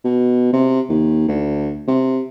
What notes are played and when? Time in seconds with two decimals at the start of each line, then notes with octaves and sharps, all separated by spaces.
0.04 B2
0.53 C3
0.89 D#2
1.28 D2
1.87 C3